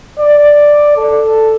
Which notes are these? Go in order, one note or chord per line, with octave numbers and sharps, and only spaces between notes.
D5
A4